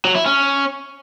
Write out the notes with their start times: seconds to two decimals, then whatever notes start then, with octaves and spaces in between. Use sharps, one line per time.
0.05 F#3
0.15 E4
0.26 C#4